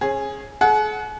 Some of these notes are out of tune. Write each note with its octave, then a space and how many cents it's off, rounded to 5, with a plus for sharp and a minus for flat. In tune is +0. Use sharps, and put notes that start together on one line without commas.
C#4 -35 G#4 +0
G#4 +45 F#5 +0